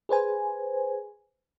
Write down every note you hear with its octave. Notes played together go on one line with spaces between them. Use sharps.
G#4 B4 C5 G#5